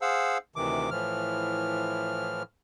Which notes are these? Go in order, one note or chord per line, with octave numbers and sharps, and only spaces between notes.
G#4 C5 F5 F#5 E6
D2 C3 D#3 E3 D6
A2 E3 F3 F6